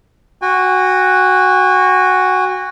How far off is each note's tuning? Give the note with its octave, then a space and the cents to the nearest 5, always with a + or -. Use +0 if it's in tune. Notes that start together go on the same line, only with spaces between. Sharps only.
F#4 +0 G#5 -40